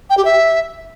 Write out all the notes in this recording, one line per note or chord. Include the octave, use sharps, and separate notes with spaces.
G5
G4
E5